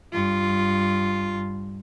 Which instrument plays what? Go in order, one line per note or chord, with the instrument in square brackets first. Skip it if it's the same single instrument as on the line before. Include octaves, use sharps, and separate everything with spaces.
[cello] G2 F4